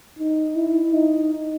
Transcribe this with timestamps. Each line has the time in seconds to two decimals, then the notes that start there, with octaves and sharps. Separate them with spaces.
0.19 D#4
0.56 E4
0.93 D#4